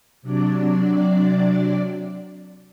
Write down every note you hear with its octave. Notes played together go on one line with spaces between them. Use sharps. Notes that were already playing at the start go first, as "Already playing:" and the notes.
C3 F#3 D4 D5